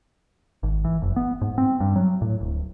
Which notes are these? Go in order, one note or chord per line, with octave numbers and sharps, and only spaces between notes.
G#1
E3
F#1
B3
G#2
C4
G2
F#3
A2
D1